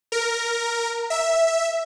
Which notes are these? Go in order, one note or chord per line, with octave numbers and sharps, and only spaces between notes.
A#4
E5